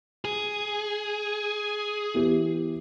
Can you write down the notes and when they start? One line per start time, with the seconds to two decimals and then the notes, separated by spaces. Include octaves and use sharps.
0.25 G#4
2.14 E3 B3 G4